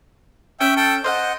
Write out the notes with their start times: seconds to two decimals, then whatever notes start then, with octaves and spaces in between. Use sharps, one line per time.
0.60 C#4 E5 G5
0.76 A4 G5
1.04 C5 D#5 F5 F#5